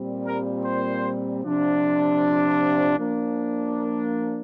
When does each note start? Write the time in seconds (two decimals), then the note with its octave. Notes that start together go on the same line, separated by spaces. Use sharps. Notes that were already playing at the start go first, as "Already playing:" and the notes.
Already playing: A#2 G3 C4
0.27 A#4
0.65 C5
1.43 C3 F3 D4
2.98 F3 A#3 D4
3.76 A#4